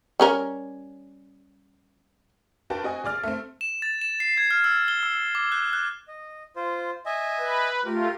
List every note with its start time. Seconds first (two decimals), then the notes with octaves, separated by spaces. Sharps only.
0.20 G3 C#4 A#4
2.70 D4 F#4 A#4 B4 G5 A5
2.83 C4 F#4 D#5 G#5
3.04 A#1 G#4 D5 F6
3.23 A3 C4
3.61 E7
3.82 A6
4.02 E7
4.20 C7
4.37 G#6
4.51 F6
4.64 E6
4.88 G7
5.03 E6
5.35 D6
5.52 F#6
5.73 F#6
6.08 D#5
6.56 F4 C5
7.06 D#5 E5 G#5
7.39 B4
7.85 A3 F4 G4 A#4